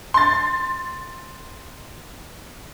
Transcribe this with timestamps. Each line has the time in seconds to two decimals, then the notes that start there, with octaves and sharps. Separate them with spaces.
0.14 C6 A6